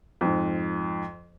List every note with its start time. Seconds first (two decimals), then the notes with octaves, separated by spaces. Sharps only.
0.21 F2 G#2